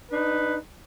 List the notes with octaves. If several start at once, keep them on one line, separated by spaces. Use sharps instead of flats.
D4 D#4 B4